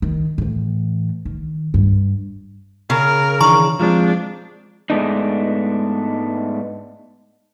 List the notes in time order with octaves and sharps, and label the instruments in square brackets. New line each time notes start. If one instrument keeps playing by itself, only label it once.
[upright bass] D#3
A2 E3
D#3
G2
[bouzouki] C#3 [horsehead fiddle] A#4
[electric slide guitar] D#3 E3 D4 [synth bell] A#5 C#6
[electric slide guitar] F3 G#3 C4 [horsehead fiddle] D4
[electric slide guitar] G#2 G#3 A3 B3 D4 D#4